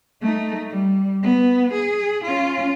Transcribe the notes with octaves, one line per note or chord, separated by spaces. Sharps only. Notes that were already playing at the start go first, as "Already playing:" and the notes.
A3 D#4
G3
B3
G#4
C#4 F4